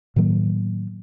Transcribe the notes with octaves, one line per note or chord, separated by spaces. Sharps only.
A2 D#3 F#3 A#3